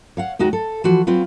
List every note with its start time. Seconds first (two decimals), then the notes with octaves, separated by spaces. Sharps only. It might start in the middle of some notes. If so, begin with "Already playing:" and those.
0.17 C#5 F5 F#5
0.39 D#2 G#3 D#4 F#4 G5
0.53 A4
0.84 E3 F3 F#4 B4
1.07 F#3 C4 F4 B4